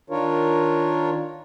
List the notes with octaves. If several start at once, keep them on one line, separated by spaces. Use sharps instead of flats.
D#3 D4 F4 A#4 C#5